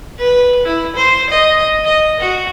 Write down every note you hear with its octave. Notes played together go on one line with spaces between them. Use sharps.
B4
E4
C5
D#5
D#5
F#4